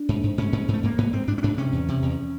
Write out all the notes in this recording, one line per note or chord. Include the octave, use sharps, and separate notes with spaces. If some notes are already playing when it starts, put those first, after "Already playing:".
Already playing: D4
G#2
G#2
G#2 C#4
G#2
G#2
A3
G#2 A#3
G#2 B3
G#2 C4
G#2 D4
C#4
G#2 D4
C3 C#4
E2
C3
E2